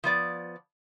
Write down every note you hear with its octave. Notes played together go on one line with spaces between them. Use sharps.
F3 B3 D5